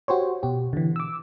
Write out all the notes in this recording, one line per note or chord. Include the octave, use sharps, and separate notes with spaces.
F#4 G4 C5 C#5
B2 G4
D3 E3
D6 E6